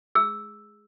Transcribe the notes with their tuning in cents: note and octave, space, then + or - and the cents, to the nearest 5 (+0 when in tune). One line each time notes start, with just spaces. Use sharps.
G#4 +0 E6 +0